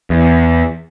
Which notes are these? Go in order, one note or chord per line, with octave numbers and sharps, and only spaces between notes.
E2